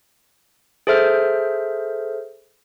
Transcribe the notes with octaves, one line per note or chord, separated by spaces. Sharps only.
G#4 A4 C5 E5 F6 G6